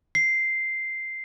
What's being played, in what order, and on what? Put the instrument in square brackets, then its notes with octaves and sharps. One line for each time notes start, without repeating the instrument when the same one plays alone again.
[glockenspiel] C7